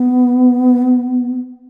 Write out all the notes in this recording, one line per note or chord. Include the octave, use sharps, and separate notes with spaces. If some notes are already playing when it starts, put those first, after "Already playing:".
Already playing: B3